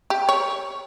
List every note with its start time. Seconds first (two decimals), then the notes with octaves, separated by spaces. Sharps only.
0.10 G4
0.29 C#5